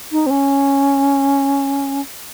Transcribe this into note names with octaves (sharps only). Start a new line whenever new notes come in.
D#4
C4
C#4